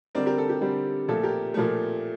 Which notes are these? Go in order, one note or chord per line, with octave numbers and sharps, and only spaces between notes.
D3 G3 C4 A#4 D5
G4 A#4
A4
G4
D3 G3 C4
A#2 F3 A3 A4
G4 A#4
A#2 F3 A3